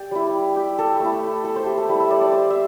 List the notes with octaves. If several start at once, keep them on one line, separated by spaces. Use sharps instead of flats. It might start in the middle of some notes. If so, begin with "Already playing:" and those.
Already playing: G4 D5 G5
G3 E4
G4
A4
A3 E4
A4
C5
G4
A4
G3 E4
E5
D5
D5
C5
E5